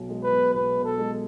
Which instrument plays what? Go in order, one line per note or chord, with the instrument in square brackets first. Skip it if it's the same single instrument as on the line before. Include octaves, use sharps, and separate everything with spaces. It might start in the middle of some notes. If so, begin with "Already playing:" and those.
Already playing: [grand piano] B1 B2
G#3
[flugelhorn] B4
[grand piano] B1
[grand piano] B1 [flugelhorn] B4
[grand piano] B2
[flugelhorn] A4
[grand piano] G#3